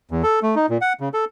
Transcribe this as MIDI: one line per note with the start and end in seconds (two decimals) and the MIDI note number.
0.11 0.23 40
0.23 0.40 69
0.43 0.55 57
0.56 0.66 63
0.69 0.78 46
0.81 0.93 78
1.00 1.09 49
1.14 1.25 69